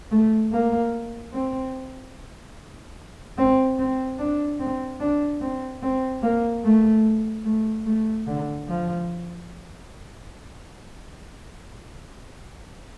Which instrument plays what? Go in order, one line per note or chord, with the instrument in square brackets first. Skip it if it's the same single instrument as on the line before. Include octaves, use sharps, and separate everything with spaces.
[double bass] A3
A#3
C4
C4
C4
D4
C4
D4
C4
C4
A#3
A3
A3
A3
D3
F3